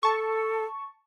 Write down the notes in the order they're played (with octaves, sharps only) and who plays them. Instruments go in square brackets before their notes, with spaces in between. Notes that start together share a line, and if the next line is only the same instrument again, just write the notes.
[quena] A4 [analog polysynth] A5 C#6